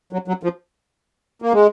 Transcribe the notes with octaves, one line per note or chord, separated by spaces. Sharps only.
F#3
F#3
F3
A#3
G#3